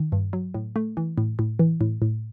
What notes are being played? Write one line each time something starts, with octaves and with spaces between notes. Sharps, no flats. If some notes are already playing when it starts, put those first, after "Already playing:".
Already playing: D#3
G2
F#3
A2
A3
E3
A2
A2
E3
A2
A2